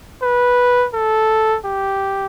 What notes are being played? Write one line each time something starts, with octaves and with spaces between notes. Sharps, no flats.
B4
A4
G4